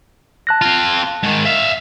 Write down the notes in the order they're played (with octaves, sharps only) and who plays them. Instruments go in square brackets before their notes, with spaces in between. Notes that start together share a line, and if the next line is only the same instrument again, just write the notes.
[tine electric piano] A5 F#6 A#6
[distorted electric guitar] C4 F4
G#2 D#3
E5 F5